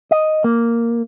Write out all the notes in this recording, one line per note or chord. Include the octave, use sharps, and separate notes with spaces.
D#5
A#3